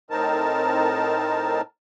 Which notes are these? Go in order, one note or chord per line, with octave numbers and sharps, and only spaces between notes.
A2 C4 D#4 A#4 A5